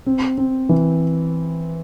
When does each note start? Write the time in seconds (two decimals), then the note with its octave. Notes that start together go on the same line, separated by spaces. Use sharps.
0.06 C4
0.38 C4
0.69 E3